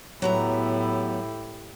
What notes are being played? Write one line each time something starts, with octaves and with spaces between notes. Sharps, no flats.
A2 F#3 B3 E4 G4 A#5